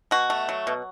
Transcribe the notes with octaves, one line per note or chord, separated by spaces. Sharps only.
B2 F#4
A3
F#3
B2